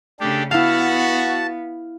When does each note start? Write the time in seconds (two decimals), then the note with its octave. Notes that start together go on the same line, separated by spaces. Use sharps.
0.20 C#3 A3 D4 G4 A4
0.51 B3 E4 F#4 F5 A5